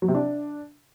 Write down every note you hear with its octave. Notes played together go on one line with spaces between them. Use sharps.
F#3
C3
D4